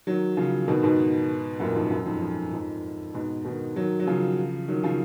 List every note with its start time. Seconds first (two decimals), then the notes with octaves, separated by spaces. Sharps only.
0.07 D#3 F#3
0.37 C#3 F3
0.68 B2 D#3
0.83 G#2 B2
1.60 F#2 A#2
1.75 F2 G#2
1.91 F#2
2.06 F2 G#2
2.21 F2
2.53 F2 G#2
3.14 G#2 B2
3.45 B2 D#3
3.76 D#3 F#3
3.99 F#3
4.07 C#3 F3
4.68 D#3 F#3
4.83 C#3 F3